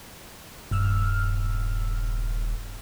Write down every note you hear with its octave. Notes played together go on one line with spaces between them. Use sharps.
D#1 G2 E6 F6